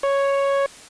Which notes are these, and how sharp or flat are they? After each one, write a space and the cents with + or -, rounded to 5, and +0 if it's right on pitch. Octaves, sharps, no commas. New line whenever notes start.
C#5 +0